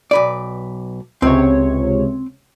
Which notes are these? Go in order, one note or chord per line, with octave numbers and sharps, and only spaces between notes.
B1 B4 D5
C#2 C3 C4 C#5